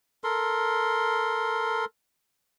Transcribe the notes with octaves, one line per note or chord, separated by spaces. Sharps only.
A4 A#4 C6